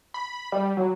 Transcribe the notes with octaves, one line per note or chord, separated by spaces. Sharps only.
B5
G3
F#3